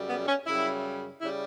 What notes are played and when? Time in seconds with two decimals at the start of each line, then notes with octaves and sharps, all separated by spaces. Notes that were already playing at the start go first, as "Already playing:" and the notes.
Already playing: F#2 C#3 G3
0.08 B3
0.27 C#4
0.46 F#2 C#3 G3 E4
1.22 C#3 G3 E4